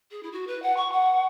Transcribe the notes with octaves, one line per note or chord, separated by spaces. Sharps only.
G#4
E4
F#4
B4
F#5
C#6
F#5